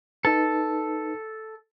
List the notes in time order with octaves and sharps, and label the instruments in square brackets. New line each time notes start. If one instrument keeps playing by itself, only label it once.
[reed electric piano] D#4 B4 [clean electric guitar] A4